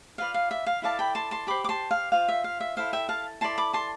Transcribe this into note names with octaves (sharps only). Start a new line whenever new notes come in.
F4 B4 D5 F5
F5
E5
F5
E4 A4 D5 F5 A5
G5 B5
A5 C6
A5 C6
G4 C5 B5 D6
D6
A5 C6
F5
F4 C5 F5
E5
F5
E5
E4 A4 C5 F5
E5 G5
F5 A5
E4 A4 D5 A5 C6
B5 D6
A5 C6